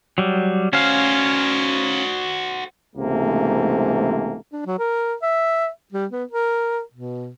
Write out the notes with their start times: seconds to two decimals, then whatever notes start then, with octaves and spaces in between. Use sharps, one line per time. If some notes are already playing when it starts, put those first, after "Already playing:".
0.18 F#3 G3
0.73 C#4 F#4 C5 F5
2.96 C#2 G#2 C3 E3 A3 A#3
4.53 D4
4.66 F#3
4.79 A#4
5.22 E5
5.93 G3
6.12 B3
6.31 A#4
6.93 B2